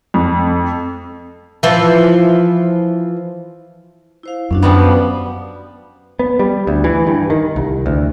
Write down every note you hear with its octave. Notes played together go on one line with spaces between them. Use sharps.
F2
E3 F3
E4 C5 F5
F#2 C#4 D4 F#4
F3 G3 B3
F#4
B3
G3
D2
E3
G2
D#3
C2
D2